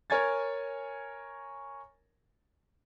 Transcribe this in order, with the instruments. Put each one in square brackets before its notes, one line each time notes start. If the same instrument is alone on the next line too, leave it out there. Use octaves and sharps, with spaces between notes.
[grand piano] A#4 C#5 G#5 G#6 A6